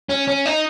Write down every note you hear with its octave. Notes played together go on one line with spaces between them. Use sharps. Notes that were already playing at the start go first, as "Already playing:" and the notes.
C#4
C#4
D#4